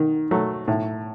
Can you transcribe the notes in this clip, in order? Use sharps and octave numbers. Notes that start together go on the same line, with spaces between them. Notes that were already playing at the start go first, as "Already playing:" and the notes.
Already playing: D#3
F#3 A3
A2